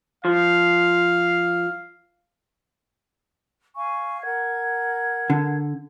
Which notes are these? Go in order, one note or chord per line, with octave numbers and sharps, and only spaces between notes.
F3 F5
F5 G#5 C#6
A#4 F#5 G#6
D3